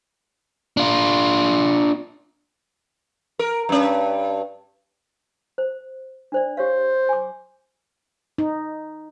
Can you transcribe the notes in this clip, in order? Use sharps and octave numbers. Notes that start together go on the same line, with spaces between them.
D4 F4
A#4
G2 C#4
C5
D4 C5 D5
G4 C5 C#5 F5
G#5 D6
D#4